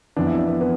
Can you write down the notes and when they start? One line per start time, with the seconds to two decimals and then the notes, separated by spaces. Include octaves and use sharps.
0.17 F2 E3 B3 D4
0.27 E4
0.37 D4
0.48 B3
0.61 E3 B3